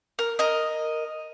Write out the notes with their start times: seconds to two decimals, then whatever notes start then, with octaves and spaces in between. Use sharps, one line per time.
0.19 A#4
0.39 A#4 D#5